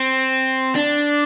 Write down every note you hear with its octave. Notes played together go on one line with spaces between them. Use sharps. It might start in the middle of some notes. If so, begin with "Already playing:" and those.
Already playing: C4
D4